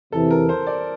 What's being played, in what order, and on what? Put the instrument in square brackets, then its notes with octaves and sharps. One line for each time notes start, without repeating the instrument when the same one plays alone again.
[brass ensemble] E2 C3 E3 [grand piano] A4
[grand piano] A#4
C5
D5